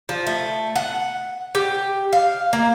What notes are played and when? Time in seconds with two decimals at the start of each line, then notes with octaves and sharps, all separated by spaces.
0.09 F3
0.27 A3
0.76 F#5
1.55 G4
2.13 F5
2.53 A#3